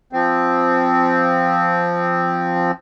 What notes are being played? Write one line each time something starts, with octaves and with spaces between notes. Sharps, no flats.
F3 C4